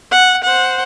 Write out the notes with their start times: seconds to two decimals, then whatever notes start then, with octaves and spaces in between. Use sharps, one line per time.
0.11 F#5
0.44 C5 F#5